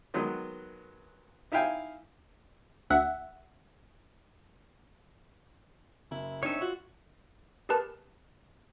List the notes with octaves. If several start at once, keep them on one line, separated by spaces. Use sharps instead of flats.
D#3 F#3 G#3 B3 B4
D#4 E4 E5 F5 G5 G#5
D2 E5 F#5
F#1 E4
C4 D4 D#4 C#5 E5
F4 F#4
G4 G#4 A#4 B4 A5